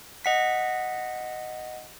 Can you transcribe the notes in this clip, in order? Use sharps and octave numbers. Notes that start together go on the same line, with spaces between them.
D#5 F#5 B6